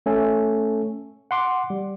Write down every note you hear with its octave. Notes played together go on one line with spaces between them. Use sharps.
A3 C#4 A4
F#5 C6 D6
G3